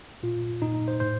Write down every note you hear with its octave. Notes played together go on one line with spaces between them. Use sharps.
A#2 F4
A#2 D#4
D#4
C5
A2 C5